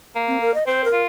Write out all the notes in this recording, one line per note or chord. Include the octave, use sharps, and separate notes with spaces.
A#3
C4
A#4
D#5
C4 C5
A#4
F4